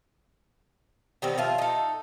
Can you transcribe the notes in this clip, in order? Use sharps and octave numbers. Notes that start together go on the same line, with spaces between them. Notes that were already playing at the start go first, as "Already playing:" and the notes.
D#3 G3 B3 C4
F3 F4 E5
D#4 A4